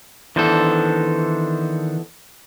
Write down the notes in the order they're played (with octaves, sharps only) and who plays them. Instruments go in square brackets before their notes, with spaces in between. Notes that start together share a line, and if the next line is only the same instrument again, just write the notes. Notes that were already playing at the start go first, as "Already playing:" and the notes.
[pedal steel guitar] D#3 D4 C5 [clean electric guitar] E3 B3 A4